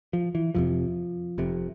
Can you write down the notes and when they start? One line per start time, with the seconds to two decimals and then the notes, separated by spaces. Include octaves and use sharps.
0.13 F3
0.35 E3
0.55 F1 F2 C3 F3
1.38 F1 F2 C3